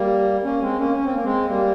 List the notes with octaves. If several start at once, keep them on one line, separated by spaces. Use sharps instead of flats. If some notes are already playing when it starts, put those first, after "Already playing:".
Already playing: G3 A#3
A#3 C#4
G#3 C4
A#3 C#4
C#4
C4
A#3
G#3 C4
G3 A#3